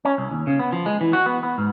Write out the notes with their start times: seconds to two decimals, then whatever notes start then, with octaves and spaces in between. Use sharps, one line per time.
0.05 C#4
0.18 C2
0.31 D#2
0.47 C#3
0.59 B3
0.72 F3
0.86 G#3
1.01 E3
1.13 F#4
1.26 B3
1.43 B3
1.58 G#2